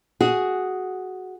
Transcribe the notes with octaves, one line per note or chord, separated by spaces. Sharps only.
F#4 G#4